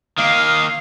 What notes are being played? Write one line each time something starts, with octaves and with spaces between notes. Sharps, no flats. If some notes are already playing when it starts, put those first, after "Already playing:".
D#3 A#3 F5